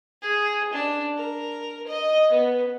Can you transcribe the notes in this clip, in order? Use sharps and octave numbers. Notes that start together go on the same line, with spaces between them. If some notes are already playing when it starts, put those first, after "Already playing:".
G#4
D4
A#4
D#5
B3